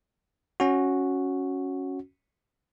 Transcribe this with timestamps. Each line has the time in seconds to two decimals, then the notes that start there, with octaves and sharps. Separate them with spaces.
0.60 C#4 F#4